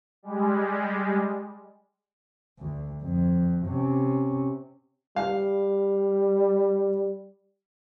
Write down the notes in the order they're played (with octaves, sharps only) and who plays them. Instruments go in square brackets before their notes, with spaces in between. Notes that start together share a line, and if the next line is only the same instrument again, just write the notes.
[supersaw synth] G3 G#3
[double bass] D2
F2
C3 C#4
[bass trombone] G3 [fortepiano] F5